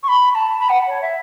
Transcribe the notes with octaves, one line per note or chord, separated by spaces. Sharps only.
C#6
B5
B5
A5
B5
F#5
C#5
E5